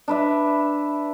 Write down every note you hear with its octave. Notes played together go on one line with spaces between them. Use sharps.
D4 B4 E5